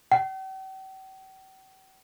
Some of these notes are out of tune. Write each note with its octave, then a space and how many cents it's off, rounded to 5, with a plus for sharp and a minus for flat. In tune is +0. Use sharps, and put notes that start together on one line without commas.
G5 -45